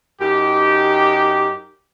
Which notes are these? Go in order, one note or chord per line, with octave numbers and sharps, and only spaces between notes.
F#2 D#4 G4